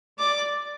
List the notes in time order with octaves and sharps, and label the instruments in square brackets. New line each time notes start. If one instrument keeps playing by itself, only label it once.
[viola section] D5 [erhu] D6